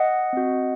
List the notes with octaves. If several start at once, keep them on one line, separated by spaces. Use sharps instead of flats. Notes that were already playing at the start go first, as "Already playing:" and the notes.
Already playing: D#5 F#5
C4 F#4